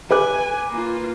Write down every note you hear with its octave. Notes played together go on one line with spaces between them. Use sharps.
B4 G#5 D6 F#6
A#3 F4